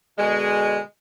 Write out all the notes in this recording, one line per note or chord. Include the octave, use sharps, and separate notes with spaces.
B2 D3 G#3